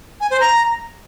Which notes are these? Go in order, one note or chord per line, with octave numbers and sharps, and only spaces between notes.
G#5
C5
A#5